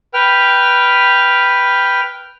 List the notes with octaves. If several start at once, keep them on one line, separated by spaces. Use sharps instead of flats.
B4 G5 F6